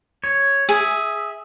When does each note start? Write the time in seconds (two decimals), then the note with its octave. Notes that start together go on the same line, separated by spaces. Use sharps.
0.24 C#5
0.69 G#4 E5